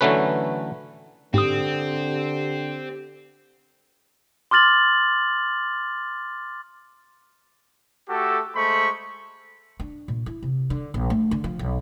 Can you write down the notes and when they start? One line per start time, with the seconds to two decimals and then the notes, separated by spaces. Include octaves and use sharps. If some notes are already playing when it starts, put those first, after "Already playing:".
0.01 D3 E3 F#3 A3 C#4 B4
1.34 G#2 D3 C4 G4 D#6
4.51 C6 D6 F6 A6 F#7
8.09 A3 F#4 G4 A4
8.56 G#3 A3 C5 B5 C#6
9.80 D4
10.08 A#2
10.26 E4
10.43 C3
10.70 D3
10.94 A#1
11.10 A3
11.31 D3
11.44 F3
11.59 B1